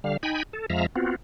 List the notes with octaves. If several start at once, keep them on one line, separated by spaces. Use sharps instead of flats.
D3 G3 F5
D#4 G5 G#5 B5
A4
F2 F3 G#3 E5 F5 A#5
B3 C4 F4 F#4